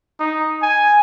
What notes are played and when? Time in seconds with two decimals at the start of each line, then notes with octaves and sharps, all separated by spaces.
0.20 D#4
0.62 G#5